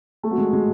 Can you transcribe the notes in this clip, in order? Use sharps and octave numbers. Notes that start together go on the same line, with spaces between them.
A3
F#3
G#3
G#3